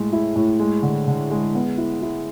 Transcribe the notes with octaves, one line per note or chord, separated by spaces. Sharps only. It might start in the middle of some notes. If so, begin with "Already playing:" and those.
Already playing: A2 G#3
E4
A2
G#3
D3
D3
G#3
B3
E4
E4